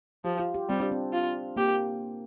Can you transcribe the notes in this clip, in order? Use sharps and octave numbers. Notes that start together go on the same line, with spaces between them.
F3 G4
F4
G4
G3 C4
D4
C4
F4
A#3 G4